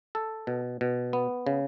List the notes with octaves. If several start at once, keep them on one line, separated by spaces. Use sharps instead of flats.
A4
B2
B2
B3
C#3